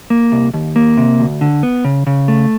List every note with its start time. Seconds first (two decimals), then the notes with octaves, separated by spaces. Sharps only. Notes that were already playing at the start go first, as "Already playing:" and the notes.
0.10 A#3
0.32 C2
0.54 D#2
0.76 A#3
0.97 C3
1.20 D2
1.41 D3
1.63 B3
1.84 C#3
2.07 C#3
2.28 A3